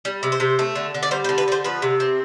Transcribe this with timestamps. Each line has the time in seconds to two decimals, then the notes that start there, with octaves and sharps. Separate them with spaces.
0.05 G3
0.23 C3
0.32 C5
0.40 C3
0.59 A3
0.75 D3
0.94 D3
1.03 D5
1.11 G3 C5
1.24 C5
1.29 D3
1.38 B4
1.48 D3 C5
1.64 F3 B4
1.82 C3
2.00 C4